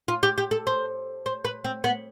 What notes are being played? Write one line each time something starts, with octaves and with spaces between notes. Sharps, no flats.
F4
G4
G4
A4
C5
C5
B4
C4
B3